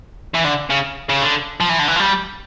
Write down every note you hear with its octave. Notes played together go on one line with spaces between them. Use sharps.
E3
D3
C#3
C#3
D3
F3
E3
D3
E3
F3
G3